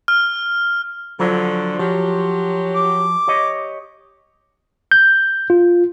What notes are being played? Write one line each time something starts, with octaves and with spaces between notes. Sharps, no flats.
F6
D3 F3 F#3
F3 F#3 G4
D6
G4 C#5 D#5
G6
F4